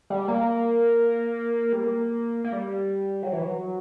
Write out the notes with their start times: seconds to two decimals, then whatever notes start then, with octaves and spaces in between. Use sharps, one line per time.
0.10 G3
0.28 A#3
1.73 G3
1.84 A#3
2.44 A#3
2.52 G3
3.23 F#3
3.32 E3
3.42 F#3